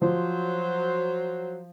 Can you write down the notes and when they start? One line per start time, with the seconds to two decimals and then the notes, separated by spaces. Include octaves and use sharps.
0.02 F3 F#3 C5